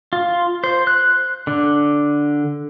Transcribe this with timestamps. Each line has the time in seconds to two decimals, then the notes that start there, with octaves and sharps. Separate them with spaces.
0.13 F4
0.64 C5
0.87 F#6
1.47 D3